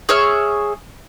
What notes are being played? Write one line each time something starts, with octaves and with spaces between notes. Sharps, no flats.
G#4 C#5 E5 F6